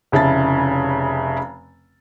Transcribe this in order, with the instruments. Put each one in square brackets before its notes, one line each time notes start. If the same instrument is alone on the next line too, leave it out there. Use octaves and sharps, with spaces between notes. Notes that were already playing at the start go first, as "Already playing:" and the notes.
[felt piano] F1 C#3 E4 A5 A6